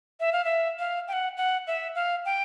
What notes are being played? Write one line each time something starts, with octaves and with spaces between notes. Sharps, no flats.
E5
F5
E5
F5
G5
F#5
F#5
E5
F5
G5